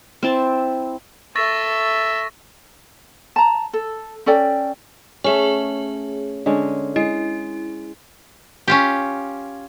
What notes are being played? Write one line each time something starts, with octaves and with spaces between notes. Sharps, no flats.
C4 E4 A5
A4 E5 C#6 A6 A#6
A5 A#5
A4
C#4 A4 D5 G5
A3 C#4 G#4 C#5
D3 G#3 C#4
G#3 E4
C#4 F4 G4